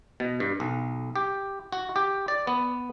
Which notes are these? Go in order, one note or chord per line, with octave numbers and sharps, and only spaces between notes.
B2
G2
B1
G4
F#4
G4
D5
B3